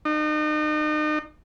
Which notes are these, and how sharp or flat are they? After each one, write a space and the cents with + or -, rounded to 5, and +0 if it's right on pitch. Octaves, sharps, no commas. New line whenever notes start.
D#4 -40